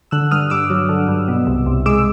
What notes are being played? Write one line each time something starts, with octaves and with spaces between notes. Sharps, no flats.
D3 E6 F#6
G2 D#6 F6
G2 D6 E6
F#3
D3
G2
B2
C2
C2
G#3 D6 E6